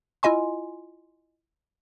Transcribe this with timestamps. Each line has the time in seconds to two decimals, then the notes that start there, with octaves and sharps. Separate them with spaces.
0.23 E4 F4 D#5 G#5 C6